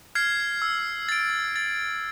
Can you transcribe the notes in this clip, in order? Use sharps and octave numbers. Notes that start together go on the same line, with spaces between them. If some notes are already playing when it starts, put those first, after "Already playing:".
F6 G#6 C7
E6
A6 D7
A6